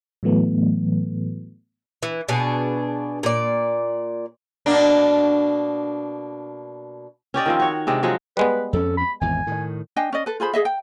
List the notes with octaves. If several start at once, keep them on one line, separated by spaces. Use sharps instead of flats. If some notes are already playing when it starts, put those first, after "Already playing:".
A2 E3 F#3 A3 B3
E3
B2 D4 G#4
A#2 D5
B2 A#3 D4
C#4 G4 D5 D#5
D#3 F3 C4
F#4 C#5
C3 G#3 D4
F3 F#3 G#3 F#4
G3 G#3 B3 B4
F2 C#4 A4
B5
G#1 E2 G#5
A2 D#3
D4 D#5 G5 G#5
C#4 D5 D#5
A4 B4
F4 G#4 C5 B5
G#4 D#5 E5
G5